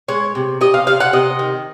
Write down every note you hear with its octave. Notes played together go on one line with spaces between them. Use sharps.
G#3 C#5
C3
C3 D#5
F5
C3 F5
F#5
C3 D#5
D#3